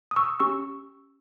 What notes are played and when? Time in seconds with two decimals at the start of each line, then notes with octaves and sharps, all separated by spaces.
0.11 D#6
0.16 C#6 E6
0.40 C#4 G4 C#6 E6